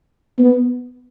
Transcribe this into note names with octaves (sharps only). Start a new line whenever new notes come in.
B3